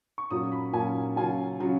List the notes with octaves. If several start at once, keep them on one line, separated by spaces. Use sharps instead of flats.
C#6
A#2 F#3 A#3 C#4 D#6
B5
A#2 F#3 A#3 C#4 G#5
C#3 F#3 C#4 F4 G#5
C#3 F#3 C#4 F4